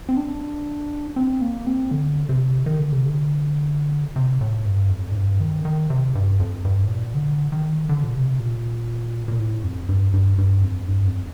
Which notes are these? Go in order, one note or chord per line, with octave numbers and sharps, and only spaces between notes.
C4
D4
C4
A#3
C4
D3
C3
D#3
D3
C3
D3
C3
A2
G2
F2
A2
G2
D#3
D#3
C3
G2
F2
G2
A2
A#2
D3
D#3
D3
A#2
C3
A#2
A#2
A2
F2
G2
G2
G2
F2
G2
F2